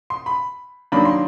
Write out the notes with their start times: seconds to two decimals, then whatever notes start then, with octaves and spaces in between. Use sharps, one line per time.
0.10 C6
0.26 B5
0.92 D#3 F#3 A#3 D4 B5
1.05 C6